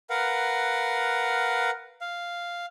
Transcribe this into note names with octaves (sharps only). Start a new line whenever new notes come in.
A#4 B4 F5 F#5
F5